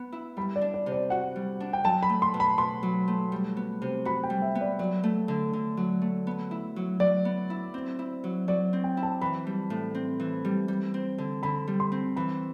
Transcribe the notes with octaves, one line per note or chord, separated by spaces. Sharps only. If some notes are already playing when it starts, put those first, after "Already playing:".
Already playing: B3
E4
G3 B5
D5
D4
D5
C3
D5
F#4 F#5
G3
D4
G5
F#3 A5
B5
A3
C6
B2
B5
B2 C6
F#3
A3
G3
B3
C3
F#4 B5
G5
G3
E5
B3
D5
F#3 D5
A3
D3
D3
F#3
A3
B3
E4
F#3
F#3 D5
B3
E4
C4
E4
F#3
F#3 D5
C4
G5
E4
A5
E3 B5
G3
A2
C4
E3
G3
G3
C4
D3
D3 B5
G3
C6
C4
E3 B5